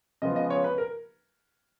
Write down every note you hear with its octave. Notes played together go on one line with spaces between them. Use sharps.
C#3 F3 G#3 B3 F4 D#5
D#5
C#5
B4
A#4